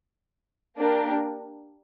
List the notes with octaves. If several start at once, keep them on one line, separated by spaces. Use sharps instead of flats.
A#3 D4 G4 A#4